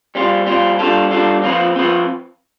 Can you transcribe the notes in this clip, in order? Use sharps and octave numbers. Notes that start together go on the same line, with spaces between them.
G3 C4 F4
G3 C4 F4
G3 D4 F4 A4
G3 D4 F4 A4
F3 C4 F4 B4
F3 C4 F4 B4